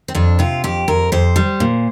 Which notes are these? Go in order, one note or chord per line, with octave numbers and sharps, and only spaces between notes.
C4
F2 D4
C3 F4
F2 G4
F2 A#4
F2 C5
G3
A#2